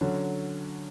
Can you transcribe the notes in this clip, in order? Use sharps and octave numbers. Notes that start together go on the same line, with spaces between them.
D3 F#3 C#4